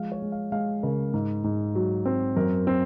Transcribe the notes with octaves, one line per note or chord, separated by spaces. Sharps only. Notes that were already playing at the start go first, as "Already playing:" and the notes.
Already playing: F3 G#3 F5
C#5
G#3
F5
G#3 F5
C#3 A#4
G#2
G#2
F#3
C4
F#2 A#4
C4